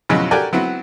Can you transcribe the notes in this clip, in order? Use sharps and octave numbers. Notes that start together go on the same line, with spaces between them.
F2 B2 E3 F#3 G#3 C#4
F#4 G4 A4 A#4 D5 G#5
F#3 B3 C4 E4 F#4